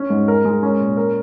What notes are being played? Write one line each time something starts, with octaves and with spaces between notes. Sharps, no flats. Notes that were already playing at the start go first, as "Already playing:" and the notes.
Already playing: C#4
G#2
A#4
G#3
C#4
A#2
A#4